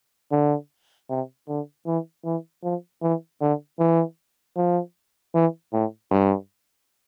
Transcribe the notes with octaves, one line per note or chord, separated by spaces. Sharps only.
D3
C3
D3
E3
E3
F3
E3
D3
E3
F3
E3
A2
G2